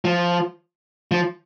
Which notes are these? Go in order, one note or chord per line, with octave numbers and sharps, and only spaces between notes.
F3
F3